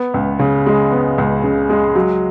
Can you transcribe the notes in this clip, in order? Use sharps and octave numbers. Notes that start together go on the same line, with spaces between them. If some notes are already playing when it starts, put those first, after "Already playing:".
Already playing: B3
C#2
C#3
G#3
B3
C#2
C#3
G#3
F#3